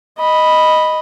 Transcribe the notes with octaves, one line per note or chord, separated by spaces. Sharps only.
D#5 B5